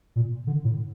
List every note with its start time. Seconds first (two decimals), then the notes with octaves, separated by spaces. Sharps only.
0.16 A#2
0.47 D3
0.64 A2